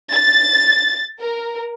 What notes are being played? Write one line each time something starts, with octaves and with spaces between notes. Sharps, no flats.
A6
A#4